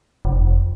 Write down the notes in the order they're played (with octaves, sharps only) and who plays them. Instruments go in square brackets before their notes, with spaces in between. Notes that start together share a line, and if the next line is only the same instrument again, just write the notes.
[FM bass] F1